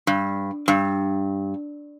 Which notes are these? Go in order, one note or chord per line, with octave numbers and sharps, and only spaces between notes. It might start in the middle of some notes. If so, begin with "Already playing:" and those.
G2
G2